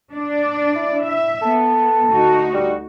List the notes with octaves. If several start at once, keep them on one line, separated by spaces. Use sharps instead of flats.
D4 D5
E4
E5
B3 A4
D2 D#4 F#4
G3